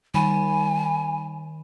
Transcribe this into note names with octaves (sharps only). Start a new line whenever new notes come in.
D#3 G3 G#5 B5